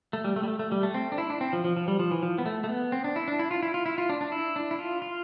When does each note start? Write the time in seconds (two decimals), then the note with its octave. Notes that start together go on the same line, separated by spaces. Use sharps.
0.13 A3
0.24 G3
0.36 A3
0.43 G3
0.48 A3
0.59 A3
0.72 G3
0.83 A3
0.94 C4
1.12 D4
1.18 E4
1.30 D4
1.41 C4
1.53 F3
1.64 F3
1.77 F3
1.88 G3
1.99 F3
2.11 E3
2.23 F3
2.38 B3
2.46 A3
2.64 A3
2.69 B3
2.92 C4
3.04 D4
3.16 E4
3.28 D4
3.39 E4
3.51 F4
3.63 E4
3.74 F4
3.86 E4
3.98 F4
4.09 D4
4.21 D4
4.32 E4
4.56 D4
4.71 E4
4.79 F4
5.02 F4